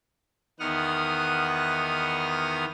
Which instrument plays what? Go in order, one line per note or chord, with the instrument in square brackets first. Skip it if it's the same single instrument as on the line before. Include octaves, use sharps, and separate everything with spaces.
[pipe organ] E2 D#3 B3 F#5 D#6 F6